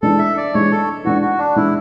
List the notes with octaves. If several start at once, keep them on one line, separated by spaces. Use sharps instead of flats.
E3 G#3 D4 A4
E5
D5
E3 G#3 D4 C#5
A4
E3 G#3 D4 F#4
F#4
D4
E3 G#3 D4 E4